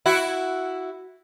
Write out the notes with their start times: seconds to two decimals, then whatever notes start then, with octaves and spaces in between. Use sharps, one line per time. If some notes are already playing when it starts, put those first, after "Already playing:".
0.06 E4 F#4